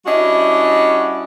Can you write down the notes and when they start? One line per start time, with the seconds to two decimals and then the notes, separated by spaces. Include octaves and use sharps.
0.06 G3 C#4 D4 E4 F#4 D#5